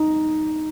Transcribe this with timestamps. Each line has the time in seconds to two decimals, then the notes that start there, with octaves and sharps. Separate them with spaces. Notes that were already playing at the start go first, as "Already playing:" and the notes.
Already playing: D#4